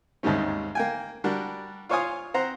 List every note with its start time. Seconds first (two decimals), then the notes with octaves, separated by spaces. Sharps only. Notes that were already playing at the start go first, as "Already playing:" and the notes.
0.23 D#2 G#2 C3 D#3 G3 C#4
0.75 A#3 G5 G#5
1.24 G3 D4 F#4 A#4
1.89 F4 C5 C#5 F5 G#5 D#6
2.34 C4 C5 F#5 A#5